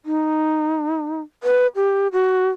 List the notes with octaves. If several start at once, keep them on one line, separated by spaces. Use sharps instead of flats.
D#4
B4
G4
F#4